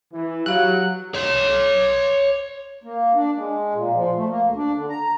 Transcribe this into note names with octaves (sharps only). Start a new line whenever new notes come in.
E3
F#3 G4 F5 F#6
C#5 C6
A#3
D4
G#3
A#2
F3
A3
A#3
D2
D4
D3
A#5